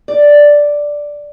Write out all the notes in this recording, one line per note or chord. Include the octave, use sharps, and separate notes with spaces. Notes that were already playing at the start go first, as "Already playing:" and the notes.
D5